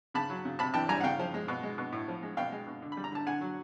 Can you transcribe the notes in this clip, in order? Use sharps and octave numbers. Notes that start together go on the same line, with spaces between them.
C#3 A5 B5
F#3
C#3
C3 A5 B5
E3 G5 A5
G3 G#5 A#5
F#5
C#3 F5 G5
F3
G#3
B2
G#3
B2
A2
F3
G#3
B2 F5 G5
G#3
B2
D3
G3 B5
A#5
D3 A5
D3 F#5 G#5
F#3